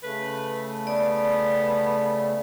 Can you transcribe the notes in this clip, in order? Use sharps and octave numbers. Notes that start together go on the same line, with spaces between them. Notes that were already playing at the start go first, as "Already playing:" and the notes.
C#3 A3 B4
B3 D5